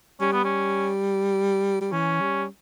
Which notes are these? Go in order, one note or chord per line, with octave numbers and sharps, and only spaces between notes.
G3 C#4
B3
C#4
G3
E3 C#4
G3